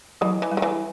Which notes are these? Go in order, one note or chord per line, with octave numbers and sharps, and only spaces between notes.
E3 F#3
E3
G3
D#3
E3